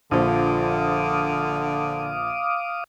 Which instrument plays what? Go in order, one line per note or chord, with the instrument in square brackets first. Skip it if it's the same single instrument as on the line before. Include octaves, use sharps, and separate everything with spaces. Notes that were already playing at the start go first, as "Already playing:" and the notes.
[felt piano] A#1 F3 [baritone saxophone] D3 [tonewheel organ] F5 D6 D#6